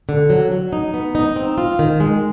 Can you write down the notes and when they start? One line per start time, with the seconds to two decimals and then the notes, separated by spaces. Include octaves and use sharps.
0.09 D3
0.30 F#3
0.52 F#3
0.73 D#4
0.94 B3
1.15 D#4
1.36 C4
1.58 F4
1.79 D#3
2.00 G#3